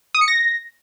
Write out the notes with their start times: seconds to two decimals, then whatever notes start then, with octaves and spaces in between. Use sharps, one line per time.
0.15 D#6
0.21 C#7
0.28 A#6